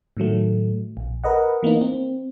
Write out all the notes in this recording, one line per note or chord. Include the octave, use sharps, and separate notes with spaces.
A2 D#3 F#3 A3
A#1
A#4 B4 D#5 F#5
E3 A#3 B3 D#4
C4